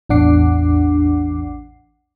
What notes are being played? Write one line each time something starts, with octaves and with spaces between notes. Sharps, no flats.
A1 E2 D4 F#5 D6 C7